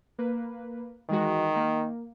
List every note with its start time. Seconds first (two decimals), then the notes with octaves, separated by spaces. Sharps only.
0.19 A#3 B4
1.09 D#3 E3 G#3 F#4
1.56 A#3